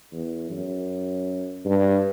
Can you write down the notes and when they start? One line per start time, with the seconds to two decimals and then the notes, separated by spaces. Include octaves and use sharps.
0.13 E2
0.50 F#2
1.66 G2